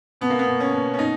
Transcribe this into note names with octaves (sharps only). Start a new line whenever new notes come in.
B2 B3
A#3
B3
B2
C#4
B2
C#4
B2 D#4